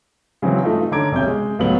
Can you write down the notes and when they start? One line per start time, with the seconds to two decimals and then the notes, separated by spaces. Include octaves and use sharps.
0.42 C#3 E3 F#3 C4
0.63 G2 A3 D#4 F4
0.92 D3 C#4 A#5 D6 G#6 D7
1.12 B1 F#2 C3 C#4 G6
1.27 G#3
1.59 C#2 A2 F#3 B3 F#7